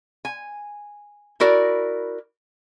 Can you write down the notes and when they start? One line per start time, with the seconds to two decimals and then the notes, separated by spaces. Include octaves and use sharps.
0.25 G#5
1.40 E4 F#4 A#4 D5